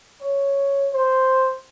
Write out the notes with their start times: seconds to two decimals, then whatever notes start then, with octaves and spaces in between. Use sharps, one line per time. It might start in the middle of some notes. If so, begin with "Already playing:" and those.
0.21 C#5
0.93 C5